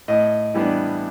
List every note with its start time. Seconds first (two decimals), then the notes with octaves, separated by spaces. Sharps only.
0.08 A2 D#5
0.54 E3 G3 B3 D4